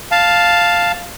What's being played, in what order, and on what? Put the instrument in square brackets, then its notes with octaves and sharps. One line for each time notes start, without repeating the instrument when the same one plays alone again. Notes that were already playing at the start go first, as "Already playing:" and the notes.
[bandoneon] F5 A5